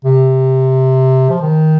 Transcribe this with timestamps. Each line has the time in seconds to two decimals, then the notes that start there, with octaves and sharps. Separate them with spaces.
0.05 C3
1.30 F3
1.42 D#3